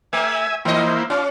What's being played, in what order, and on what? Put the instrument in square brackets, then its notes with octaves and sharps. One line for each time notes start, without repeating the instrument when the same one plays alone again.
[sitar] A3 [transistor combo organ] E5 G#5
[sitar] E3 D#5 [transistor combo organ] A#3 E4 C5
[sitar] C#4 [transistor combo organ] F4